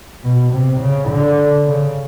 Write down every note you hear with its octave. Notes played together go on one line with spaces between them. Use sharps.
B2
C3
C#3
D3
C#3